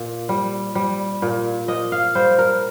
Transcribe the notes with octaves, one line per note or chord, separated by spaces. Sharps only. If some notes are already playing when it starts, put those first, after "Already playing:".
Already playing: A#2
G3
G3
A#2
A#2 D#5
F5
G3 C5
A#4